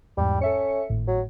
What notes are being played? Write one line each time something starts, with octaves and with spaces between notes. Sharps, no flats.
E2 G#2 G3
C#4 A4 E5 C#7
G#1 A2
F#3